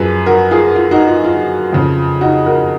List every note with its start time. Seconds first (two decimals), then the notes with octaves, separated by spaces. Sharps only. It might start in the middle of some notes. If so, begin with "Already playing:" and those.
Already playing: F#2 F3 G#4 B4
0.26 F#4 A#4
0.51 F4 G#4
0.76 F4
0.91 D#4 F#4
1.07 F4
1.24 F4
1.73 F2 C#3 F3
2.21 D#4 F#4
2.46 F#4 A#4